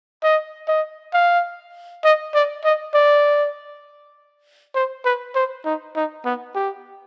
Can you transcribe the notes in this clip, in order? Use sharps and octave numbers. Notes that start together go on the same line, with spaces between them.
D#5
D#5
F5
D#5
D5
D#5
D5
C5
B4
C5
D#4
D#4
B3
G4